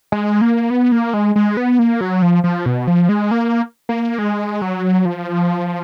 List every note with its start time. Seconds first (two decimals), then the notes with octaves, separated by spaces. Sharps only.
0.12 G#3
0.41 A#3
0.70 B3
0.92 A#3
1.14 G#3
1.36 G#3
1.57 B3
1.79 A#3
2.01 F#3
2.22 F3
2.44 F3
2.66 B2
2.88 F3
3.09 G#3
3.31 A#3
3.89 A#3
4.18 G#3
4.62 F#3
5.05 F3